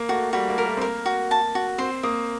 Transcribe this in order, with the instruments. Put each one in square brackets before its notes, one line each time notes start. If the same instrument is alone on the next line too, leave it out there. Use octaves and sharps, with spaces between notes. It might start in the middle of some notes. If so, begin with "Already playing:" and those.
Already playing: [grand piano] A#3
[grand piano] A3 [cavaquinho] F#4
[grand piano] G3 [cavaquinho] F#4
[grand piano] A#3
[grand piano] G3 [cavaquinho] A#4
[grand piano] A3
C4
[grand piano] A#3 [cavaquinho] A#4
[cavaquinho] F#4
A5
F#4
[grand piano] C4 [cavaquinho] C5
[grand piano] A#3 [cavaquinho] D#6